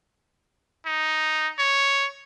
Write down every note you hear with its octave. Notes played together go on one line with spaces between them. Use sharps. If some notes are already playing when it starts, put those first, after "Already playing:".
D#4
C#5